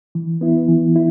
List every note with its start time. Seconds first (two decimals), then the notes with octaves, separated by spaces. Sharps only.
0.15 E3
0.41 B3 E4
0.68 E3
0.96 E4